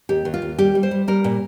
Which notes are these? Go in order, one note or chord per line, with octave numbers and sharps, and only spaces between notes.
D#2 G4
D#2
F4
D#2
G3 G4
G3
C5
G3
G3 A#4
A#2